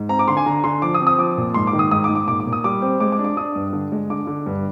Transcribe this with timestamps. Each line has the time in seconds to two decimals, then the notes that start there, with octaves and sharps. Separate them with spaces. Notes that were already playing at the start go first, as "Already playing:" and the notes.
Already playing: G#2
0.09 C4 A#5
0.19 D6
0.27 D3 C6
0.37 G#5
0.46 D3 A#5
0.64 D3 C6
0.82 F3 D6
0.94 D#6
1.00 C4
1.07 D#6
1.18 F3 D6
1.37 A#2
1.54 G#2 C6
1.67 D6
1.73 D#3
1.79 D#6
1.91 G#2 D#6
2.04 D6
2.09 G#2
2.15 D6
2.27 A#2 D6
2.40 D6
2.47 A#2
2.53 D#6
2.64 G3 D6
2.82 C4
3.00 G#3 D6
3.12 D6
3.18 D4
3.24 D6
3.37 D4 D#6
3.55 G2
3.73 D3
3.92 G#3
4.10 D3 D6
4.27 D3
4.46 G2